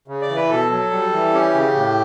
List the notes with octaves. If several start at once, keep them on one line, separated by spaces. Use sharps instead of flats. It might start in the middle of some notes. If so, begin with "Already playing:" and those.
C#3
D5
E3
B4
B2 A4
F#3
G3
E3
C#4 G4
C#3
A2